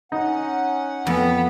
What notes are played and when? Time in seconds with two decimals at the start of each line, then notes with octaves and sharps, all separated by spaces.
0.12 C#4 D#4 F#5
1.07 F2 B3